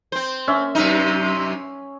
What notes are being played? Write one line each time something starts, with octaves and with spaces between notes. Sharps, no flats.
C4 C5
C#4 E5
F#2 C3 D#4